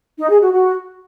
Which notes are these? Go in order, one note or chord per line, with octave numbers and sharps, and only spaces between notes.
D#4
G#4
F#4
F#4